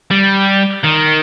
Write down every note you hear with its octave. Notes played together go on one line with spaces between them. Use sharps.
G3
D#3